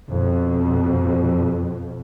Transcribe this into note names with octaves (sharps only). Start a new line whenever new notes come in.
F2 B2